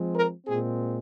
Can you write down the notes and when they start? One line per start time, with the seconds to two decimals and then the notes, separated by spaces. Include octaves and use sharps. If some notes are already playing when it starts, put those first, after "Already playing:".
Already playing: F3 G#3 C4
0.13 A#4
0.46 A#2 G#3 C4 G#4